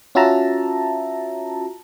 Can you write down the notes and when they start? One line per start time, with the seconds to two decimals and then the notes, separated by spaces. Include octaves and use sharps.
0.15 C#4 F4 F#4 E5 A5 A#5